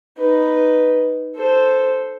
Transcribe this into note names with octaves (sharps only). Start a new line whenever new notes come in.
D#4 B4
A4 C5